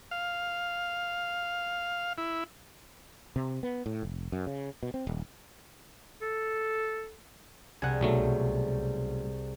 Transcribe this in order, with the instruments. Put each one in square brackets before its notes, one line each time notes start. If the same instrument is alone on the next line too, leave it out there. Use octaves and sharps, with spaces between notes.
[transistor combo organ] F5
E4
[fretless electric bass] C3
B3
A2
F1
F#2
C#3
B2
C4
D#1
[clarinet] A4
[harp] C2 G#4 [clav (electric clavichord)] F#5 G#5
[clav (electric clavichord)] B1 F#3 A3